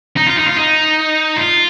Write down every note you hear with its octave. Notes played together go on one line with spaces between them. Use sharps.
D#4
F4
D#4
F4
D#4
F4